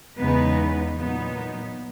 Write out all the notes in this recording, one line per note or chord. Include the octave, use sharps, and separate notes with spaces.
E2 C#3 G#3 B3 D#4 B4
A#2 F#3 B3 D#4